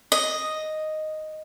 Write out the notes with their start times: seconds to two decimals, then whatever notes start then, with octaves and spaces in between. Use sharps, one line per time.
0.12 D#5